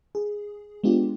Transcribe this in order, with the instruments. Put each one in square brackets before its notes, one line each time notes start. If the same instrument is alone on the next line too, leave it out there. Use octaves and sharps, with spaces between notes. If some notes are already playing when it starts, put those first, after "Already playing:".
[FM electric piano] G#4
G#3 B3 D4 F4 G4